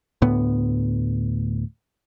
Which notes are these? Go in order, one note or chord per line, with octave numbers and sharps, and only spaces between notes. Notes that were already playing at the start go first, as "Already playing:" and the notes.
D2 A2 B3